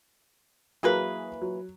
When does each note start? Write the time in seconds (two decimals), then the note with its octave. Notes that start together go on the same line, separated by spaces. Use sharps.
0.83 E3 F#3 A#3 G#4 B4
1.42 F#3